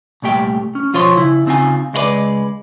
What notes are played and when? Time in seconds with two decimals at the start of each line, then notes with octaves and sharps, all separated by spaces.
0.22 C2 A#2 A3 G4 G5
0.75 C#4
0.93 B2 F3 F4 C5 C#5 C6
1.17 C#3 E4
1.46 C#3 C4 D#4 F4 G#5
1.93 C#2 G#3 D#4 F4 B4 D5